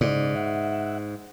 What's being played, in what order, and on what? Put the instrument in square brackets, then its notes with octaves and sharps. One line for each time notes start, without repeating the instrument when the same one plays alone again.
[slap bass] G#2 [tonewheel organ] C#3 D5
[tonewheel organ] E5 F#5